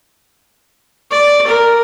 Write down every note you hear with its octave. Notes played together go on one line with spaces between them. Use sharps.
D5
A#4